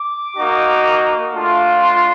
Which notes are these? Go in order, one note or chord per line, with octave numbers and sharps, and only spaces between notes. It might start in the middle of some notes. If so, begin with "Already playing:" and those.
Already playing: D6
A#3 D#4 F#4
A3 D4 F4
C6